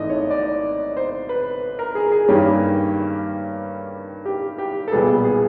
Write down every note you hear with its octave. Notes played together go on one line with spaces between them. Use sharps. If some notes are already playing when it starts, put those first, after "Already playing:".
Already playing: G#1 G#2 E3 A3 D5 D#5
C#5
D5
C5
B4
A#4
G#4
G#4
G2 D#3 G3 A#3 C#4 G4
G4
G4
A4
B1 A#2 G3 B3 G#4
G#4